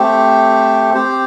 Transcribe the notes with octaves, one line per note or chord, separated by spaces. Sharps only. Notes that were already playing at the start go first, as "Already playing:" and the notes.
Already playing: A3 C4 G4
C4 G4 C5